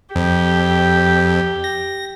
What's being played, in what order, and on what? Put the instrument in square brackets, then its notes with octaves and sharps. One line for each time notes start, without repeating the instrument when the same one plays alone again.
[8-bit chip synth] F2 [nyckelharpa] G4
[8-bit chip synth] A#6